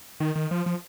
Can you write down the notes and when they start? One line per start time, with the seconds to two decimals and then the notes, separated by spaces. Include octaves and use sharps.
0.20 D#3
0.36 D#3
0.51 F3
0.66 F3